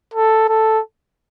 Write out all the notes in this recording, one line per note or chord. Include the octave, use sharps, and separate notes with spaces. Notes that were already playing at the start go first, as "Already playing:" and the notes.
A4
A4